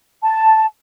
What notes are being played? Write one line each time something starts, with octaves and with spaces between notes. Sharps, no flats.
A5